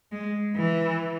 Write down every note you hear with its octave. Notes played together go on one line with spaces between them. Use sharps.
G#3
E3